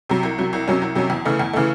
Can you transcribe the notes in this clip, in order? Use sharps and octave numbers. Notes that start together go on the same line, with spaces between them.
C3 F#3
C2
C3 F#3
C2
C3 F#3 C#4
C2
C3 F#3 C#4
E2
C#3 E3 A3
E2
C#3 E3 A3